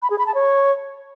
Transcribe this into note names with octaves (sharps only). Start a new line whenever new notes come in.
B5
G#4
B5
A5
C#5